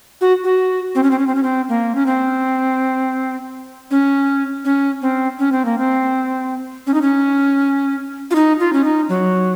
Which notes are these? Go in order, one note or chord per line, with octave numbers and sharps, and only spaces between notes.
F#4
F#4
C4
C#4
C4
C#4
C4
C#4
C4
A#3
C#4
C4
C#4
C#4
C4
C#4
C4
A#3
C4
C#4
D#4
C#4
F4
D#4
F4
C#4
D#4
F#3